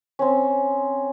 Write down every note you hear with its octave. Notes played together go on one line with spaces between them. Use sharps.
C4 C#4